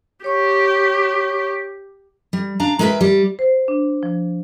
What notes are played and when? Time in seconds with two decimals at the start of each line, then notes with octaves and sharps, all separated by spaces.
0.24 G4 C#5 C#6
2.33 G3
2.60 D4 F5 A#5
2.79 G#3 A#4 B4 C#5 E5
3.01 G3
3.39 C5
3.68 D4
4.03 F3